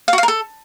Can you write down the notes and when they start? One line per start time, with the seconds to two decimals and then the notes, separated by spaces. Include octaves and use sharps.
0.08 F5
0.13 F#4
0.18 F5
0.23 A#4
0.28 A4